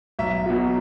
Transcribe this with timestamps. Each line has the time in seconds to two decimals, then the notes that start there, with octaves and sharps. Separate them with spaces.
0.19 B1 E5
0.46 B2 F#3